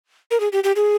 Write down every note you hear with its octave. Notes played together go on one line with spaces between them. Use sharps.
A#4
G#4
G4
G4
G#4